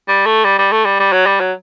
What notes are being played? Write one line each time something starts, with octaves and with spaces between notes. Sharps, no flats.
G3
A3
G3
G3
A3
G3
G3
F#3
G3
F#3